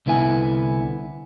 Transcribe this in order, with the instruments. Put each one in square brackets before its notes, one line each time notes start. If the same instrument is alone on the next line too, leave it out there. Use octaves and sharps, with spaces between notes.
[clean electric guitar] C2 D3 B3 E4 G#5